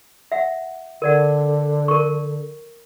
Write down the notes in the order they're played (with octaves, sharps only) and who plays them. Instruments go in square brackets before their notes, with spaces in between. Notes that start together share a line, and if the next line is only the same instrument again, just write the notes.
[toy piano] E5 F#5
[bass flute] D3 [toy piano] A#4 D5 F#5
[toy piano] A#4 C#6